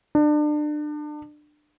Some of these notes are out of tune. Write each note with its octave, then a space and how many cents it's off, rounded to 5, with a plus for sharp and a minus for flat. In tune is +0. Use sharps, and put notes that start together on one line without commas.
D4 +30